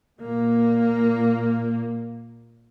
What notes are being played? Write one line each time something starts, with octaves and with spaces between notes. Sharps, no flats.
A#2 A#3